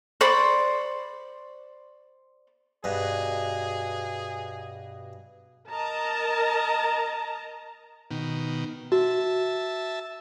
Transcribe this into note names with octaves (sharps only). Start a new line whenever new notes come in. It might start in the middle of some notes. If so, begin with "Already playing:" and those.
C5 D5 B5 C#6
G2 B2 G#4
A#4 D#5 A5 A#5
B2 D#3
F#4 E5 A5